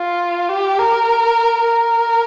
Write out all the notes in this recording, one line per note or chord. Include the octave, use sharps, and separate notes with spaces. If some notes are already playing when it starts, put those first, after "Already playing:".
Already playing: F4
G4
A#4
A#4